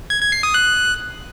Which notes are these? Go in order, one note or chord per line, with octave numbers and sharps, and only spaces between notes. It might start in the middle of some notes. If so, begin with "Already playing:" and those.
G#6
G#6
C7
D#6
F#6